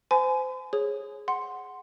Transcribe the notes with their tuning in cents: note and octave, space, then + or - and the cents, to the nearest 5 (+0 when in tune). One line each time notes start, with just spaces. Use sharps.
C5 -30 G#5 +25 C6 -45
G#4 +0 C#5 -20
F#5 +0 C6 +0